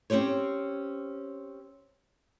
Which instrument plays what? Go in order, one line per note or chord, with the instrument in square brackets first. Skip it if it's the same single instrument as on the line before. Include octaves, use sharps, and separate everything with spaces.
[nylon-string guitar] C4 C#4 G4 C5 C#5